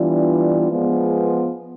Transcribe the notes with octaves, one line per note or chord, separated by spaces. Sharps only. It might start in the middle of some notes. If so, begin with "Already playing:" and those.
Already playing: E3 G3 B3 D4 F4
F3 G#3 B3